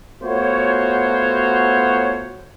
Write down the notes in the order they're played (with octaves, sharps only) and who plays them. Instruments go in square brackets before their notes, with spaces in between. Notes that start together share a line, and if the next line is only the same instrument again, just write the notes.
[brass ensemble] A3 B3 F4 F#4 C5 C#5